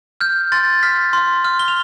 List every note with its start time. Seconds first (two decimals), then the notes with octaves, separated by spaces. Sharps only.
0.21 F6 G6
0.52 C6 A6
0.83 F6 B6
1.13 C6
1.45 F6
1.59 G7
1.68 F7